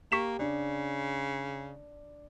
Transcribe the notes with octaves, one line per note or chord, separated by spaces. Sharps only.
A#3 G4 C#6 B6 E7
C#3 D4